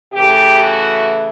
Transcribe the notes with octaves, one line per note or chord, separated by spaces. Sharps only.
C#3 E3 A3 G4
F#4